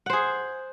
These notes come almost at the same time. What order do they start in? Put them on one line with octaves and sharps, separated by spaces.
F#5 C5 G#4